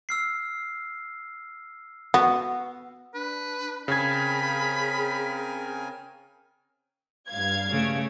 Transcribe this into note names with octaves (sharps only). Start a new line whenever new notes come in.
E6 F6 C7
B3 F#4
D4 B4
C#3 C4 G#4 A#4 G#5 B5 G#6
G2 F5 G#6
C#3 A3